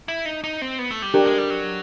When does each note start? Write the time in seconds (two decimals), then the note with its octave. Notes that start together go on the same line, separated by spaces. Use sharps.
0.08 E4
0.26 D#4
0.44 D#4
0.62 C4
0.79 B3
0.91 A3
1.02 G3
1.14 F#3 D4 G4 A#4
1.26 G#3
1.38 G3
1.50 F#3